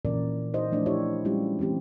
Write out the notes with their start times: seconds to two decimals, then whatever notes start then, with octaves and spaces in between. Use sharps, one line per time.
0.05 A#2 C#3 E3 C#4 A#4 D5
0.54 D#4 F#4 C5 D#5
0.72 F3 A3 D4 E4 D5
0.86 E4 G4 C5 C#5 E5
1.25 G3 G#3 C#4 E4 F4 G4
1.59 E3 A3 C4 G4